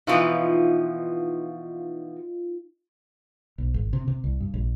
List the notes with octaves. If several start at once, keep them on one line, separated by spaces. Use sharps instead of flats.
B2 E3 F3 D#4 F4
B1
G#1
C3
C3
C2
G2
A#1